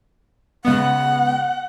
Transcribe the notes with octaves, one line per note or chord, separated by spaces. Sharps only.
C#3 G#3 B3 F#5